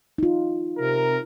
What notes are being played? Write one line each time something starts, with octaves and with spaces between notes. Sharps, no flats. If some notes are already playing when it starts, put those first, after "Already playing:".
D#4 F4
C3 A#4